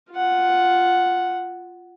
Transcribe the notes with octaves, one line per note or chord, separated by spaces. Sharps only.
F4 F#5